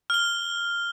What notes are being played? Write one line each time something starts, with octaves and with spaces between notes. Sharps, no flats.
F6 G7